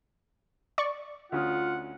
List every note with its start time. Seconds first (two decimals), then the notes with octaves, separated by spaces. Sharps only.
0.78 D5 C#6
1.32 D2 C#4 F4 F#5 D#6